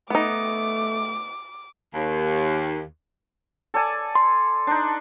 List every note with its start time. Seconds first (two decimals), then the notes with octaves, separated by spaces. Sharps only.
0.10 A3 B3 D#4 D6
1.94 D#2
3.74 A4 D5 G#5
4.15 C6
4.67 D4 D#4